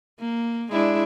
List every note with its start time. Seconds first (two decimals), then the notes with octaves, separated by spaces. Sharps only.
0.20 A#3
0.72 G#3 D4 E4